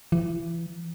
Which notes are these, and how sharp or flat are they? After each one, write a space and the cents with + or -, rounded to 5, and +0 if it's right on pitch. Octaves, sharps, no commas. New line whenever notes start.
E3 +30